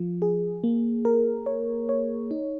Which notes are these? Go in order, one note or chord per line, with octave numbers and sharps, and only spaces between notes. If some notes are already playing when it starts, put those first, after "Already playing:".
Already playing: F3 F4
G#4
A#3
A#4
C#5
C#5
D#4